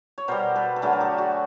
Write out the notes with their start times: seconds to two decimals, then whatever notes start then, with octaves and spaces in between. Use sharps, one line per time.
0.18 C#5
0.28 B2 G3 A#4 C5
0.56 A4 B4
0.76 A4
0.82 D3 F#3 A3 G#4 A#4
0.93 A#4
1.01 G4 A4
1.18 F#4 G#4